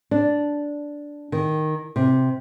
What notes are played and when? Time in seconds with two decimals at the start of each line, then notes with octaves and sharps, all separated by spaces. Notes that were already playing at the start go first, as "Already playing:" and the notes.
0.11 D4
1.32 D#3
1.96 C3